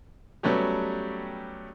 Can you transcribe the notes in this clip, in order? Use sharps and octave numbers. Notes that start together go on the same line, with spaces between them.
F#3 G3 A3 B3 C#4 G4